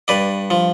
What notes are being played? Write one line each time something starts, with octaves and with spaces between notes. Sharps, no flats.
G2 B4 D5
F3